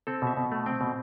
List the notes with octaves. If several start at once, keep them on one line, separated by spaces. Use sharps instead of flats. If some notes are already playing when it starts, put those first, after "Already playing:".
C4 A4
B2 E5
B2
A3
C4 G5
B2